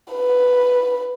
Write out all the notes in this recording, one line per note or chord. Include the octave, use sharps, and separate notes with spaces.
B4